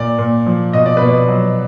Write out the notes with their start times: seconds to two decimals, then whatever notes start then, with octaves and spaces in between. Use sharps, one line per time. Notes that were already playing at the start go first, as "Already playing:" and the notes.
Already playing: A#2 D5
0.18 A#2
0.46 F3
0.73 B2 D#5
0.86 D5
0.97 B2 B4
1.09 D5
1.28 F#3